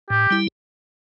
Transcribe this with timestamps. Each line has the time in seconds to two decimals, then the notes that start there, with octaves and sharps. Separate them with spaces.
0.10 A2 G4
0.30 G3 E4